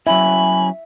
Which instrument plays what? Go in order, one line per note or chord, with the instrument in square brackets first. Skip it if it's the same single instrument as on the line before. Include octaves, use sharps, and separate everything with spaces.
[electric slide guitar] F#3 C#4 E4 [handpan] E5 [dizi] G#5 [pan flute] B5